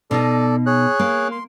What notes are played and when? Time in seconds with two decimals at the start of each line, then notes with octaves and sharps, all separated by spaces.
0.11 B2 D#4 A4 D5 D#5
0.66 G#4 C#5 F#6
0.99 A#3
1.32 C6